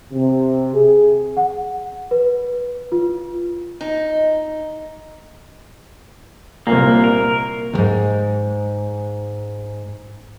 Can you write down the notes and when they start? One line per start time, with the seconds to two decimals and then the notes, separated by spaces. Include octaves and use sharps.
0.12 C3
0.74 G#4
1.37 F#5
2.11 B4
2.92 F4
3.81 D#4
6.67 C2 A#2 A#3
7.04 A#4
7.73 D#2 G#2